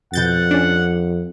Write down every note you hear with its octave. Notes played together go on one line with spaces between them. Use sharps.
F2 B2 F#5 G6 A6
C#4 D4